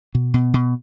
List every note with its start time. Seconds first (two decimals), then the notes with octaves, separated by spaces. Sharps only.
0.15 B2
0.34 B2
0.54 B2